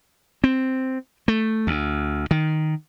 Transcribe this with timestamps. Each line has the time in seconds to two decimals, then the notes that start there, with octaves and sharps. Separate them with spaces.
0.44 C4
1.28 A3
1.67 D2
2.31 D#3